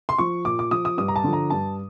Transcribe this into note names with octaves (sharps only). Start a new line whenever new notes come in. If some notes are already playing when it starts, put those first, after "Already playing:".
C6
F3 C#6
A#2 D6
D6
F3 D#6
D#6
G2 D#6
A#5
A5
D3 F3
A#5
G2 A5